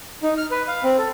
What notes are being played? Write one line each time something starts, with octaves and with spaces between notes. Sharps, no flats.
D#4
F6
B4
F5
C4
A4